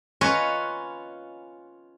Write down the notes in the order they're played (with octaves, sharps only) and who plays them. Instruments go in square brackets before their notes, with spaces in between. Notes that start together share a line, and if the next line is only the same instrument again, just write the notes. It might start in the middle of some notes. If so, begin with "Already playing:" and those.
[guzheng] C#4 F4 B4 C#5 D#5 A#5